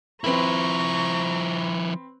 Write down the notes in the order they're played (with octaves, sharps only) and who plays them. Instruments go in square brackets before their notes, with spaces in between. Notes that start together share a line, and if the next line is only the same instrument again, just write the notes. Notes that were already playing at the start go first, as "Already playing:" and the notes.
[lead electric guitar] F3 E4 [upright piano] C4 B4 [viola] A#5 C#6